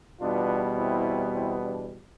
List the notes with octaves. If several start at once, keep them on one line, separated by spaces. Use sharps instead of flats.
E2 B2 G3 B3 D4 F4
C4 E4
C4 E4
D4